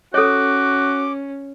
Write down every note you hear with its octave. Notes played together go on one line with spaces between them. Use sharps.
C#4 F#4 A4 C#5 D6